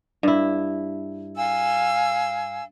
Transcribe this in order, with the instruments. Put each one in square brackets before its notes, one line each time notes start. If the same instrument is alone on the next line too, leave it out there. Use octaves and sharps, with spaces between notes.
[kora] G2 E4
[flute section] F5 G#5 E6